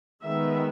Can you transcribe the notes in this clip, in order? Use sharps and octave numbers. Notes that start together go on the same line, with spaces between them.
D#3 G#3 B3 E5